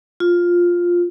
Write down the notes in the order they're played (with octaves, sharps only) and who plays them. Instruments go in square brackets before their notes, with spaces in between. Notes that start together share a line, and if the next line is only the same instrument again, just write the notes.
[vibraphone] F4